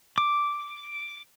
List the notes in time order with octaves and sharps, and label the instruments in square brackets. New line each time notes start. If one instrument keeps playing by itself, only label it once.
[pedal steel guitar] D6